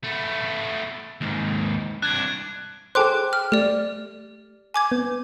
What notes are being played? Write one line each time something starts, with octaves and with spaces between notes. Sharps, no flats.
A3 B3
D#2 G#2
C2 D4 F#6 G#6
G#4 A4 C5 G5 D6 F#6
F6
A3 G4 D5
G#5 D6 G#6
B3